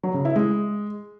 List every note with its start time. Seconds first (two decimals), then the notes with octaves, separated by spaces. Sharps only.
0.03 F#3
0.14 C#3
0.25 E4
0.36 G#3